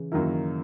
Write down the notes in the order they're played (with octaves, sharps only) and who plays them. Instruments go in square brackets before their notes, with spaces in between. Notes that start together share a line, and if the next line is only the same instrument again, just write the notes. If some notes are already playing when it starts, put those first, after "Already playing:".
Already playing: [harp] C#3 E3
[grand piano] F#2 D#3 A#3 E4